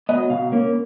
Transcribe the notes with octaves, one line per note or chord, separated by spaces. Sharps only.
F#3 B3 D#5
B2 F5
A#3 C#4